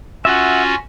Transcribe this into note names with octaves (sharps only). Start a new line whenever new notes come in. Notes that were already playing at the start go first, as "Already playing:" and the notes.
C#4 F4 F#4 E5 F#5